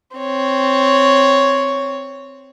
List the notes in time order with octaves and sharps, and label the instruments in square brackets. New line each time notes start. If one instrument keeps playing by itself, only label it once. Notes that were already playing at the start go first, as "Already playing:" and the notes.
[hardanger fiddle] C4 C#5